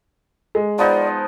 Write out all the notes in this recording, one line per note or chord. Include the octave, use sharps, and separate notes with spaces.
G#3
F3 B3 D#4 D5